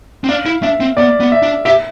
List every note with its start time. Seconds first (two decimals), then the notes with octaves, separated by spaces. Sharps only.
0.24 C4
0.29 D4 F5
0.46 E4
0.63 D4 E5
0.80 C4
0.97 B3 D5
1.20 B3
1.32 E5
1.43 D4
1.65 G4 E5